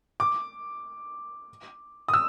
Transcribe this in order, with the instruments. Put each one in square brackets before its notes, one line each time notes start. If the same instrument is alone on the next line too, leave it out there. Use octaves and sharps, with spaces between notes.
[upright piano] D6
D#6
E6